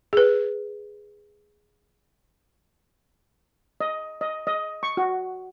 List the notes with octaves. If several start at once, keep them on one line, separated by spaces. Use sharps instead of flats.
G#4 B4
D#5
D#5
D#5
C#6
F#4